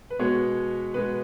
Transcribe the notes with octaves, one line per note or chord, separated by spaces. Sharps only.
B4
B2 G#3 B3 C#5
B2 G#3 B3 B4